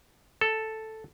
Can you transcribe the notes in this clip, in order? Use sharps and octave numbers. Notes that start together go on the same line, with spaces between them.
A4